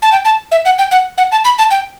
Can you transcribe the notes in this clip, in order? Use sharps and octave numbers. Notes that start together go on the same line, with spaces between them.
A5
G5
A5
E5
F#5
G5
F#5
F#5
A5
B5
A5
G5